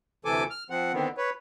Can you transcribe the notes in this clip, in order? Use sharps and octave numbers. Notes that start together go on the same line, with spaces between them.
D2 C3 E3 A4 G#5 D6
F6
F3 C4 F#5
D3 D#3 B3 C4
B4 C#5